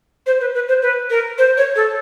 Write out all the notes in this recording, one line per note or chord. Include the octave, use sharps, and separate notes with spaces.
C5
B4
B4
C5
B4
A#4
C5
C#5
A4